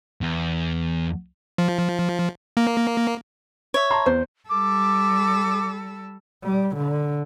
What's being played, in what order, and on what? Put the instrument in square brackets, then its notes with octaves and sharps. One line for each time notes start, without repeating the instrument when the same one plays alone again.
[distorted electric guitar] E2
[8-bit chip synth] F3
A#3
[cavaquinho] C#5 E5
[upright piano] A5 A#5 C6
[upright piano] E2 [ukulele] C5
[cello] G3 A4 [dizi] D6
[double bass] G3
D3